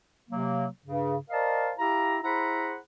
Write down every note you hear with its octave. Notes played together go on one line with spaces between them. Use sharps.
C3 F#3 A#3
G2 C#3
A#4 C5 D5 D#5 F5 A5
E4 G4 F5 A#5
E4 G#4 C5 F#5 A#5 B5